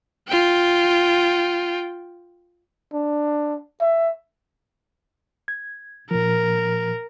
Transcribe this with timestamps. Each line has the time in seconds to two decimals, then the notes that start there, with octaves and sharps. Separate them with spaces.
0.28 F4 G5
2.93 D4
3.80 E5
5.48 G#6
6.11 A#2 F3 A#4